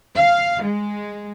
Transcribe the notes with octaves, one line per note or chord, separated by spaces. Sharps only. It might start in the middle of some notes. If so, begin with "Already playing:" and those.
F5
G#3